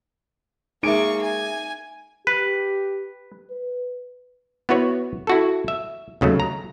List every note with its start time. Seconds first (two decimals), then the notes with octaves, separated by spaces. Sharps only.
0.83 G#3 A#3 D#4 E5 C#6 D7
1.22 G#5
2.27 G4 B4
3.51 B4
4.69 B3 E4 F#4 B4 C#5
5.27 E4 F#4 A4
5.68 E5
6.21 D#2 C#3 F#3 A3
6.40 A#5